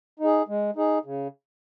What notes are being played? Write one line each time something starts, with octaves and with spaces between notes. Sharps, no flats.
D#4 G#4
G#3
D#4 G#4
C#3